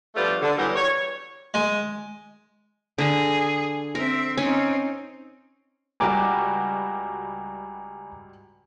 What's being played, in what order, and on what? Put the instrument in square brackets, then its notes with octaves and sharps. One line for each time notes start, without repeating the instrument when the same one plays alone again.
[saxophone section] F3 G3 A3 B3 D4 F4
D3
E3 F#3 G3 B3 G4 A#4
C#5
[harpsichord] G#3
[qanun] D3 A#5 [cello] G#4
[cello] C4 E5 [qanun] A#4
[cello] C4 D#4 [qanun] C#4
[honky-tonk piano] C#2 G3 F#4 [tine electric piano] G#5 A#5 D6